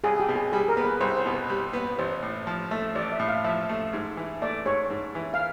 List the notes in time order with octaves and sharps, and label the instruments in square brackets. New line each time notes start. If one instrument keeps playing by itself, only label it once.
[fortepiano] C2 [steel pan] G#4
[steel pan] G4
[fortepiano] B2
[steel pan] G#4
[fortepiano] G3 [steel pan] G#4
[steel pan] A#4
[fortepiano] B3
[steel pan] B4
[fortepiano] C2 [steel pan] C5
[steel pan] C5
[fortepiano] B2
[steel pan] B4
[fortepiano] G3
B3
[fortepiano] A1 [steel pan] C5
[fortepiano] A2
F3
A3
[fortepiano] A1 [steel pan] D5
[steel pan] E5
[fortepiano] A2
[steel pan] F5
[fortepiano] F3 [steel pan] E5
[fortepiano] A3
G#2
E3
[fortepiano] A3 [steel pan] D5
[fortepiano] G#2 [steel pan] C#5
[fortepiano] G#2
E3
[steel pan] F5